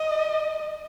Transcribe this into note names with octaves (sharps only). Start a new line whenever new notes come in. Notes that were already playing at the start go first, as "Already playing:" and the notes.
Already playing: D#5